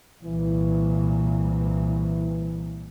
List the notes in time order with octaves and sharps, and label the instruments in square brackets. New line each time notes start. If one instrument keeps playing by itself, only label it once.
[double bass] C2 A#2 [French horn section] E3